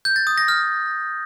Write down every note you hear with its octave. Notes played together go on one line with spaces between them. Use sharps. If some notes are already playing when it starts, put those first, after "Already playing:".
G6
A6
D#6
A#6
F6